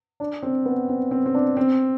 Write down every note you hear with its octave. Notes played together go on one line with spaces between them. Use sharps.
D4
C4
B3
C4
C4
C4
D4
C4